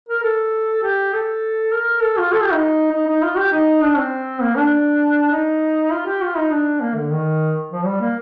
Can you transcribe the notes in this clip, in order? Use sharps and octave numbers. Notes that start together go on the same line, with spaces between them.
A#4
A4
G4
A4
A#4
A4
F4
A4
G4
D#4
D#4
D#4
F4
G4
D#4
D4
C4
A#3
D4
D#4
F4
G4
F4
D#4
D4
A#3
D3
D#3
F3
G3
A#3